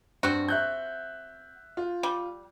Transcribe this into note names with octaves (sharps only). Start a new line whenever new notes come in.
G2 C4 F#4
E5 F#6 G6
F4
G3